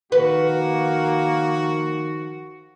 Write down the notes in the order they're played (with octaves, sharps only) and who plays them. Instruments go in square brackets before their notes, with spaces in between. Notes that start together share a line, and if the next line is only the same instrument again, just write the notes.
[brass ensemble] D#3 F3 F#4 [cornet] A#3 [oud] B4